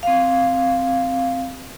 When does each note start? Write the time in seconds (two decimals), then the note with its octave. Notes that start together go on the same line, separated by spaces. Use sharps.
0.03 C4 F5